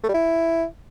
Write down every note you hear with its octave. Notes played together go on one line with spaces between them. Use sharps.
A3
G3
E4